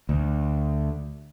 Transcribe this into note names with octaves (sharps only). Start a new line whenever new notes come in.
D2